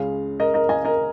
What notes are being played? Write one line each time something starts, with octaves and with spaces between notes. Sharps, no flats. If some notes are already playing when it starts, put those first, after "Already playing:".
Already playing: C#2 C#3 G#3 F5
A#4 D#5
A#4 D#5
D#5 G#5
A#4 D#5